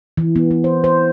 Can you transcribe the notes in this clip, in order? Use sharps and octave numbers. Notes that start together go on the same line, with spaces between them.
E3
B3
B3
C5
C5